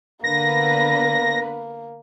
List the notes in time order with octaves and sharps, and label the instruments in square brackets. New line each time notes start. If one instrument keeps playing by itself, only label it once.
[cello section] D3 B3 B4 [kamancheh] A#3 [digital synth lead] A#6